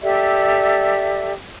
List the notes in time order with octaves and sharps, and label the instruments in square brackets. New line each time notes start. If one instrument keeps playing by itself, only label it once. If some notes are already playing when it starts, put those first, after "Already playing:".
[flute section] G4 A4 D5 E5